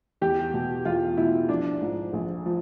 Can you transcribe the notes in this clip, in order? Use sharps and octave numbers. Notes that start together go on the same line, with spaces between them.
E2 G4
B2
E2 F4
B2 E4
A#1 D4
G#2 F3
A#1
F3